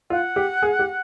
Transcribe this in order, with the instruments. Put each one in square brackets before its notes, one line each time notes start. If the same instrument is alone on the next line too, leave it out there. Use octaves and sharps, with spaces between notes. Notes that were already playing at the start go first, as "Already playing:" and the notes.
[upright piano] F4 [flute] F#5
[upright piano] G4
G#4
G4